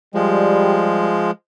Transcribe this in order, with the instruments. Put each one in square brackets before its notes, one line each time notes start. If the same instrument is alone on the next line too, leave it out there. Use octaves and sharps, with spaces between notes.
[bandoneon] F3 G#3 [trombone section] G3